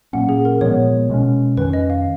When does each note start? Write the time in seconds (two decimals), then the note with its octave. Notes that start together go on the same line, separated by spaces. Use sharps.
0.13 A#2 F#3 A#3 C#4 F#5
0.29 G#4
0.45 A#4
0.61 A#2 F3 G#3 B3 C#5
1.09 B2 G#3 C#4
1.57 F2 D#3 A#3 C#4 B4
1.73 D#5
1.90 F5